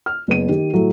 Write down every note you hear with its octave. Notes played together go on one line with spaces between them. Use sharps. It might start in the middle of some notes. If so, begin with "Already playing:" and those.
F6
F#1 B3 D#7
D#3 G4
A2 F#3 A3